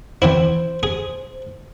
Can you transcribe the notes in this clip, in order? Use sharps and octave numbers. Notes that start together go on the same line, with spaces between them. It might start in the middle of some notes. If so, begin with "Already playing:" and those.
E3 C4 E4 C5
G#4